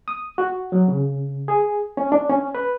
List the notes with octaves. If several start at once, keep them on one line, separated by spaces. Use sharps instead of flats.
D#6
F#4
F#3
C#3
G#4
C#4
D4
C#4
B4